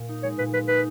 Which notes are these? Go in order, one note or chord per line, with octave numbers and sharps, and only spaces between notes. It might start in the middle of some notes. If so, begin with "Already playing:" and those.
Already playing: A#2
D#4
G#3 C#5
A#2 B4
G#3 B4
D#4 B4